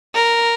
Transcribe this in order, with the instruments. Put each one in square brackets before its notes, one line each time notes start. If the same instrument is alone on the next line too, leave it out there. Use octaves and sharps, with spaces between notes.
[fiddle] A#4